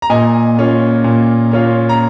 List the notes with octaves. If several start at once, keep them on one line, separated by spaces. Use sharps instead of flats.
A#5
A#2 D#5 G#5
A#3 C#4 F4
A#2
A#3 C#4 F4
A#5